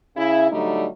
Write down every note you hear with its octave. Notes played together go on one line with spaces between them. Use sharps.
C#3 E4
D3 F#3 G3 A3 D#4